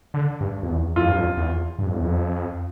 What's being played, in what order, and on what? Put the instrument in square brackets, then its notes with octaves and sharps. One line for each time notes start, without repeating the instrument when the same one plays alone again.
[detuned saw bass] D3
G2
F2
E2
[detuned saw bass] F2 [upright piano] F4
[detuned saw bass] G2
F2
E2
G2
F2
E2
F2